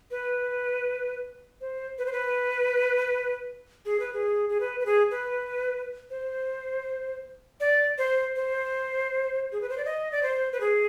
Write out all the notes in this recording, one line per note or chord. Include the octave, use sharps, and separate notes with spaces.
B4
C5
B4
C5
B4
G#4
B4
G#4
G#4
B4
B4
G#4
B4
C5
D5
C5
C5
G#4
B4
C5
D5
D#5
D5
C5
B4
G#4